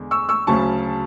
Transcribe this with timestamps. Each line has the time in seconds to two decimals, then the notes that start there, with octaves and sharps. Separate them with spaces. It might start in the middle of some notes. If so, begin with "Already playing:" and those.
Already playing: E2 D3 G#3
0.11 C#6 E6
0.29 C#6 E6
0.47 D2 C#3 F#3 C#4 A5 C#6